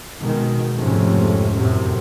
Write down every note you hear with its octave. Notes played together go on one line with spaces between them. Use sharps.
B2 D#3 G#3
F2 G#2 C3 A3 C#4
F#2 A2 C3